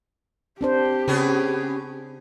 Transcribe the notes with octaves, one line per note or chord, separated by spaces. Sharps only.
C4 D4 G4 C5
C#3 B3 C#4 G#4